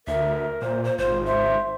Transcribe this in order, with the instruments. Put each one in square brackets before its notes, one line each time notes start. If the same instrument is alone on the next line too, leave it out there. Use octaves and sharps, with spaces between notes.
[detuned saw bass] D2 [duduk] A#4 [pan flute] E5
[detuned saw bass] A#2 [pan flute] C5
[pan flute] C5
[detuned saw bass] G#1 [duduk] F4 [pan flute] C5
[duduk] C5 [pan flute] E5